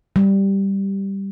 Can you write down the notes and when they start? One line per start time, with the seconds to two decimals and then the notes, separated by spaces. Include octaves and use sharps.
0.16 G3